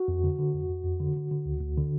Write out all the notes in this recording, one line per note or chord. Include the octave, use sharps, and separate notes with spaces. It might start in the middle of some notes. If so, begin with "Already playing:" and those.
Already playing: F#4
F2
D3
D3
F2
F2
F2
D3
D3
D3
D2
D2
D3